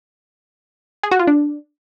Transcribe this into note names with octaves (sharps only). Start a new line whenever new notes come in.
G#4
F#4
F4
D4